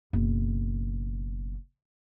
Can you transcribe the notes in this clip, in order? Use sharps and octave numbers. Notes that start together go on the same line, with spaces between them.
F#1 B2